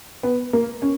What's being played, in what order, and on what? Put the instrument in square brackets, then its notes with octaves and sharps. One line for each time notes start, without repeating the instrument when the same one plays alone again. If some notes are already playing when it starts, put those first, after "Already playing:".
[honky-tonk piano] B3
A#3
C#4